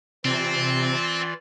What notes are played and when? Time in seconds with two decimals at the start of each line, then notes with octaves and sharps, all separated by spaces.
0.25 C3 E3 C4 F4 D5